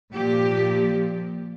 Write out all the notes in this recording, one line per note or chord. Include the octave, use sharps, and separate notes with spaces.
A#2 F3 G4